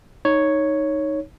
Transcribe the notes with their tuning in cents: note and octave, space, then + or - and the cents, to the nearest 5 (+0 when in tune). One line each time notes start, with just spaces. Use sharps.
D#4 +0 C#5 +0